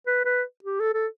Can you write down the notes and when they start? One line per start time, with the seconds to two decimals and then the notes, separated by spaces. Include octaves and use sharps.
0.07 B4
0.25 B4
0.64 G4
0.80 A4
0.94 A4